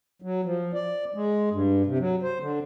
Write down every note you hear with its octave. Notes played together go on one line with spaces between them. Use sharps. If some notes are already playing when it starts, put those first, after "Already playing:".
F#3
F3
D5
G#3
G2
C3
F#3
C5
D3